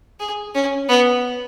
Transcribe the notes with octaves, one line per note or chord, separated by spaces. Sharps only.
G#4
C#4
B3